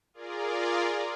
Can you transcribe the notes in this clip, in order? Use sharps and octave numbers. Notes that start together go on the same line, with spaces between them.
F4 G#4 A#4 D5